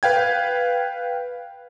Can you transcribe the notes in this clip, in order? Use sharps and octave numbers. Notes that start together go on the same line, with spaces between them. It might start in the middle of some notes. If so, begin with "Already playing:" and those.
B4 F5 G5 G#6